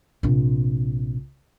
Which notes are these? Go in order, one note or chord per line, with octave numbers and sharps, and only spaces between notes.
A#1 C3